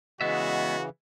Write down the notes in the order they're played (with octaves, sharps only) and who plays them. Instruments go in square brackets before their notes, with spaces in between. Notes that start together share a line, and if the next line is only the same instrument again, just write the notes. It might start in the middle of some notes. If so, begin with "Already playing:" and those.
[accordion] C#3 E3 [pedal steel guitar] G#3 B3 E5 [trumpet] F#4 [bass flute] D#5